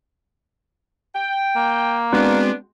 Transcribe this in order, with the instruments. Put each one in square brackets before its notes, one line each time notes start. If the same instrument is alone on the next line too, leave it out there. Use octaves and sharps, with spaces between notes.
[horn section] G5
[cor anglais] A#3
[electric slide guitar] G#3 C4 F#4 [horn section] B3 D4